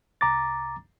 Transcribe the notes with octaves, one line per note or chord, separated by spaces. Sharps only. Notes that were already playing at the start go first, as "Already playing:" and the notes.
C2 A#5 D6 A6